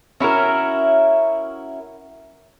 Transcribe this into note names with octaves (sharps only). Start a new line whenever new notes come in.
C#4 E4 F#4 A#4